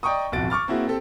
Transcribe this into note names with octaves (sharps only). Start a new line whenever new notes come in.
D5 D#5 G5 A#5 C#6 D#6
D1 B1 F2 F#4 A6 D7
C#6 D6 F6 A6
A#3 C4 E4 F#4 G#4
C4 G4 A4